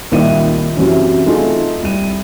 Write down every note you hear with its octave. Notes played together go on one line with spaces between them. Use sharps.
C2 A#2 D#3 D#4 E5 D#7
F#2 C3 E3 F#3 C#4
A3 D#4 F4 G#4
C2 D#7